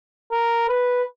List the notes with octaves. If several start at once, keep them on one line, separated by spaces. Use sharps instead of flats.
A#4
B4